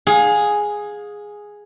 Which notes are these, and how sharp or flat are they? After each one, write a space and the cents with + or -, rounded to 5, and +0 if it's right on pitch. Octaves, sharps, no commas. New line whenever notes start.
G#4 +0 F5 +35